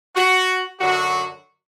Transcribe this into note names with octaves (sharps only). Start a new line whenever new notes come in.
F#4
F#2 D3 F#3 F#4